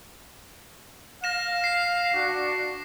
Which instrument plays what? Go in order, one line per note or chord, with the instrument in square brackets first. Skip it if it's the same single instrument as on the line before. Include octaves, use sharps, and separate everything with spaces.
[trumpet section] F5 [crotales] A#6 E7
[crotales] C7
[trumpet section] D4 F#4